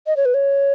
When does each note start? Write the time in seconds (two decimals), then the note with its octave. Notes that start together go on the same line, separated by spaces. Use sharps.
0.07 D#5
0.17 C#5
0.25 B4
0.34 C#5